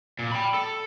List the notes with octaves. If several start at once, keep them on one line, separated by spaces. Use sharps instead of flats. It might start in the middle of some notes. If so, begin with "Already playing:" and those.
A#2
G5 B5
A4